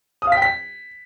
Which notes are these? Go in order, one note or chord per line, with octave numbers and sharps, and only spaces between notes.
D#6
F5
B6
G5
B6